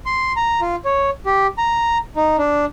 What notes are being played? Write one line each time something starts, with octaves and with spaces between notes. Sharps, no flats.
C6
A#5
F4
C#5
G4
A#5
D#4
D4